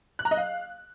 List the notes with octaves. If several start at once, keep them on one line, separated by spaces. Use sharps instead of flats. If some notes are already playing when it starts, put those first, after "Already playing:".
F#6
A#5
D#5
F5